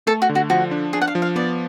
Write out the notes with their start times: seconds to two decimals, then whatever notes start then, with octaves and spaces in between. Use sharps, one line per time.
0.07 A3 A4
0.22 F#4
0.29 D3
0.35 F#4
0.50 F3 F#4
0.71 D4
0.93 D4 G#4
1.02 F#5
1.08 F5
1.15 F3
1.22 F5
1.36 B3 D5